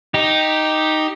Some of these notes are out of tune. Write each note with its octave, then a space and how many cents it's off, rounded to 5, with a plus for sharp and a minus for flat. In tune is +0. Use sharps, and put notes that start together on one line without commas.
D#4 +0 G4 +0